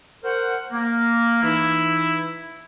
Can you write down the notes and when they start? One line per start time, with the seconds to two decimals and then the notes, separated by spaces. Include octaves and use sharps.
0.23 A#4 C5 F#5
0.72 A#3
1.43 E3 D#4 E4